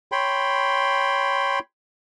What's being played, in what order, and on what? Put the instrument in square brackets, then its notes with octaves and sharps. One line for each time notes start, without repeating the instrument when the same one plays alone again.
[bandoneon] C#5 G5 B5 C6